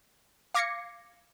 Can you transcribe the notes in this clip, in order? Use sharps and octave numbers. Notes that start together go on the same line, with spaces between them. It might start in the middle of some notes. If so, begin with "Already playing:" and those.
F5 D6 G#6 A#6 C7 C#7